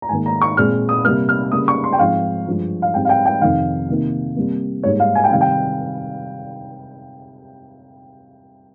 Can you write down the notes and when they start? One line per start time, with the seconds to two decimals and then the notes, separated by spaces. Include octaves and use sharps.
0.02 A#5
0.09 G#2 D#3 A#3 G#5
0.26 A#5
0.42 C#6
0.57 A#2 G#3 C4 F6
0.89 D#6
1.04 C3 G3 A#3 F6
1.29 F6
1.52 C#3 G3 A#3 D#6
1.68 C#6
1.84 C6
1.93 G5
1.99 G#2 F3 C4 F5
2.46 G2 F3 G#3
2.82 F5
2.94 G#2 G3 C4 G5
3.05 F5
3.09 G5
3.26 G5
3.41 F2 C3 D#3 F5
3.88 C3 D#3 A#3
4.36 C3 G3 A#3
4.83 G#2 G3 A#3 C#5
5.00 F5
5.15 G#5
5.24 G5
5.31 C3 D#3 G3 F5
5.41 G5